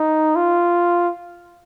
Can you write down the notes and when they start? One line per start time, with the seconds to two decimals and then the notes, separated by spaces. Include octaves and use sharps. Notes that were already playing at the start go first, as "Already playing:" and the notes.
Already playing: D#4
0.36 F4